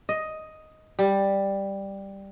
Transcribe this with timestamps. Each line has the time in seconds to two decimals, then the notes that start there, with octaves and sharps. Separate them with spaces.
0.09 D#5
0.99 G3